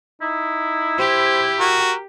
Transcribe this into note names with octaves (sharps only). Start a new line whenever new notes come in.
D#4 E4
G4 C5
F#4 A#4